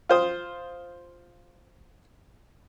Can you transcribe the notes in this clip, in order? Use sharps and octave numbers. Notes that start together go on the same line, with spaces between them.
F4 C5 D#6